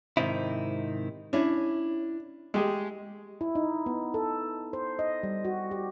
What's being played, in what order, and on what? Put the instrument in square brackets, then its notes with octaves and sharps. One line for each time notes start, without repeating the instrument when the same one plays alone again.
[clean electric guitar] G#2 C3 D#3 C4 D#4 E4
[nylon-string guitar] C#4 E4 [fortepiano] D4
[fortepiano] G#3 G4 G#4 [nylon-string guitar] A3
[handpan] E4
D#4
B3
A4
C5
D#5
G3
F#4
G4